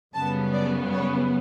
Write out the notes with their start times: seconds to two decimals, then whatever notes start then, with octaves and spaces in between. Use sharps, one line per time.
0.14 F#2 C#3 G3 B3 A5
0.53 D5
0.93 C#5